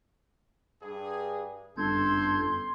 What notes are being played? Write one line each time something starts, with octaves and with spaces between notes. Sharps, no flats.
G2 G#4
G1 F#2 A4 C6 G6 G#6